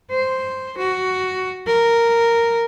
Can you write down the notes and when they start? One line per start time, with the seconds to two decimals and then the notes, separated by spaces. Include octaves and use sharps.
0.11 C5
0.78 F#4
1.67 A#4